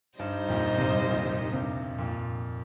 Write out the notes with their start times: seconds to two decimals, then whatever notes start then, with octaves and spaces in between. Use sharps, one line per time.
0.19 G2 G3 D#4 C5 D#5
0.48 F2 A#2
0.78 G2 C3
1.08 A#2 D#3
1.53 G2 C3
1.98 F2 A#2